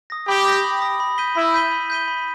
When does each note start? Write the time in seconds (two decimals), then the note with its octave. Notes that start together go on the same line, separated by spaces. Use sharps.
0.10 D#6 A#6
0.27 G4 B5
0.46 D#6 A#6
0.64 B5
0.82 D#6 A#6
1.00 B5
1.18 G6 B6 D#7 G7
1.35 E4 B5
1.54 G6 B6 D#7 G7
1.71 B5
1.90 G6 B6 D#7 G7
2.08 B5